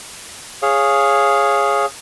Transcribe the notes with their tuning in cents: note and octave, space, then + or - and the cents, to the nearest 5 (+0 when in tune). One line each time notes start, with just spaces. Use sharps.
G#4 +0 C#5 -5 F5 +0